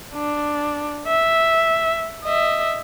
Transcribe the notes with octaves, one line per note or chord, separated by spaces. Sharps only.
D4
E5
D#5 E5